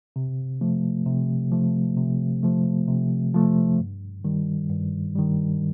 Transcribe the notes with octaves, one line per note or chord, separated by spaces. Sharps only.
C3
F3 A3
C3
F3 A3
C3
F3 A3
C3
F3 A3
G2
D#3 G3
G2
D#3 G3